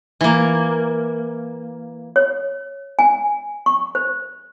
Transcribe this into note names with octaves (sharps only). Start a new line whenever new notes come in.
E3 A#3
C#5
G#5
C#6
C5